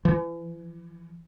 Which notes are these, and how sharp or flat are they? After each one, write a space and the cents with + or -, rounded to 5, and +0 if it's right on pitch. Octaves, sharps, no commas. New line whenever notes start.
E3 +35